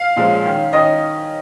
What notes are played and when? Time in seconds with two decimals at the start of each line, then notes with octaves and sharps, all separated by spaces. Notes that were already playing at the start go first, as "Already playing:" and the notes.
Already playing: F5
0.16 A#2 F3 G#3 C#4
0.45 D#3 C#4
0.73 D#3 C#4 D#5